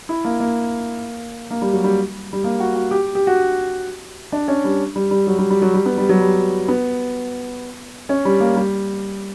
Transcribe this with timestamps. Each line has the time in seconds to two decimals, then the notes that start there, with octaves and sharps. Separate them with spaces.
0.09 E4
0.25 A#3
0.40 A#3
1.51 A#3
1.62 G3
1.73 F#3
1.84 G3
2.33 G3
2.44 A#3
2.60 F#4
2.76 F#4
2.91 G4
3.15 G4
3.27 F#4
4.32 D4
4.48 C#4
4.64 G3
4.96 G3
5.11 G3
5.27 F#3
5.39 G3
5.50 G3
5.62 F#3
5.74 G3
5.86 B3
5.98 G3
6.09 F#3
6.21 G3
6.68 B3
8.09 C#4
8.25 G3
8.40 A#3
8.56 G3